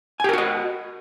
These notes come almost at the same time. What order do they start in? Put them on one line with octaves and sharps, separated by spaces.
G#5 G4 A#4 F#4 D#5